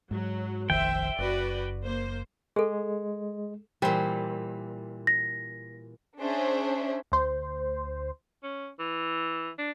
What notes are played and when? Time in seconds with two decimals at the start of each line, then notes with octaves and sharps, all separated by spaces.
0.11 G#2 F#3
0.70 F1 A#1 D#3 C5 E5 G5
1.18 F#1 F#4 B4 D5
1.84 A#3 C5
2.56 G#3 G#4 A4
3.82 A#2 E3 G3 C5
5.07 A#6
6.18 C#4 D4 G#4 C5 E5
7.12 D2 C5
8.43 C#4
8.79 E3
9.58 D4